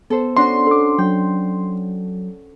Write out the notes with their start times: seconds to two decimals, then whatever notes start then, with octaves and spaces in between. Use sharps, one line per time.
0.10 B3 A4 C5
0.37 C#4 D4 F#4 C6
0.67 A4 D6
0.98 F#3 G5